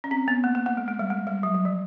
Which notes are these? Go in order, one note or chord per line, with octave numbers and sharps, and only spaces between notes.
C#4
C4
B3
A#3
A#3
A#3
G#3
G#3
G3
G#3
G3
F#3
F#3
F3